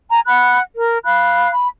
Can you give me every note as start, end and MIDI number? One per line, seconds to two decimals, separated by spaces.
0.10 0.20 80
0.10 0.20 82
0.26 0.59 78
0.26 0.59 83
0.26 0.59 90
0.75 0.98 70
1.05 1.50 77
1.05 1.50 83
1.05 1.50 90
1.52 1.68 83